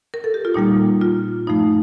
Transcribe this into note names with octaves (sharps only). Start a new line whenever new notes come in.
A#4
A4
G4
F4
A#2 G3 A#3 D#4
F4
G2 F3 A3 D#4